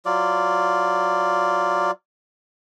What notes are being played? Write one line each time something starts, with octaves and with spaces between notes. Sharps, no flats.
F#3 F4 D5